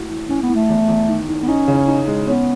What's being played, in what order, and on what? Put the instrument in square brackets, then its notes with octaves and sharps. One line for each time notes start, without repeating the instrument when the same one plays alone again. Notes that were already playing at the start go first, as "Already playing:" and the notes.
Already playing: [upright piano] A2 F#4
E3
[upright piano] A2 [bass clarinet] C#4
[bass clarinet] B3
[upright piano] A2
[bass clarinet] A3
[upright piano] E2
E2
D#3
D#3
[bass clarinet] B3
[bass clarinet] C#4 [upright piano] D#4
[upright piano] C#3
D#4
G#3
[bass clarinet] B3 [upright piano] C#4